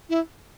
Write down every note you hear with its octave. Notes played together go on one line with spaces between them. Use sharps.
E4